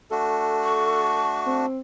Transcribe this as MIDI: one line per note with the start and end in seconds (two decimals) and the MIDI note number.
0.11 1.66 57
0.11 1.66 62
0.11 1.66 66
0.11 1.24 69
0.64 1.55 85
1.47 1.80 60